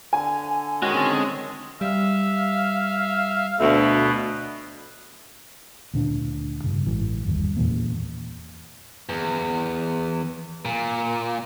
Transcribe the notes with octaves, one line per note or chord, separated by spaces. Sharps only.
D3 G#5
D#3 G#3 C#4 F#4
D3 C4 A5
G3 E5 F5
D2 B2 B3 E5
D2 A#2 C#4 D4
G2 C#3
A1 G#2 E3
G1 D#2 G3
E2 A#2 E3 A#3
E2
A#2